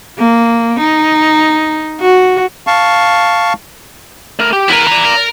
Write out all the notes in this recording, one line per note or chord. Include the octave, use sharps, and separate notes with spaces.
A#3
D#4
F#4
F5 A5 C#6
A3 A#4
G4
E2 E4 A#4 B4
D5 A#5
A#4